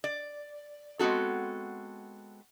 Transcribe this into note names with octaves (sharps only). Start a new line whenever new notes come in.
D5
G#3 B3 C4 F#4 A4